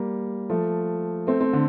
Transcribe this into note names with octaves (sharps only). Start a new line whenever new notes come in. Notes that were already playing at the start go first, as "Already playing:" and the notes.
Already playing: G3 A#3
F3 A3
A3 C4
A3 C4
D3